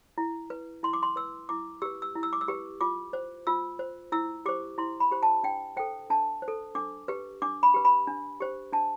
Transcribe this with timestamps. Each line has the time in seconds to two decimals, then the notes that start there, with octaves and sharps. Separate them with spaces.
0.18 E4
0.50 B4
0.83 E4 C6
0.93 D6
1.03 C6
1.16 B4 E6
1.49 E4 D6
1.82 G4 B4 E6
2.02 E6
2.15 E4
2.23 E6
2.33 D6
2.41 E6
2.48 G4 B4
2.81 F4 D6
3.13 C5
3.47 F4 E6
3.79 C5
4.12 E4 E6
4.46 G4 C5 D6
4.78 E4 C6
5.00 B5
5.11 G4 C5
5.23 A5
5.44 D4 G5
5.77 A4 C5 G5
6.10 D4 A5
6.42 C5
6.48 A4
6.75 D4 D6
7.08 G4 B4
7.42 D4 D6
7.63 B5
7.74 G4 B4
7.85 B5
8.07 D4
8.40 G4 C5
8.73 D4 A5